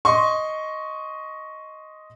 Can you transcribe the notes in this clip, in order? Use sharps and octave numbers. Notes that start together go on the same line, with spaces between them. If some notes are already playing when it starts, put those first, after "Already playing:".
D#5 C6 C#6